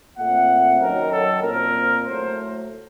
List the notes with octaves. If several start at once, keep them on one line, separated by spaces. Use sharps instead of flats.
A#2 A3 C4 F#5
F#2 D#3 F#3 A#4
A4
A#2 F3 C4 A#4
A2 F#3 A3 C5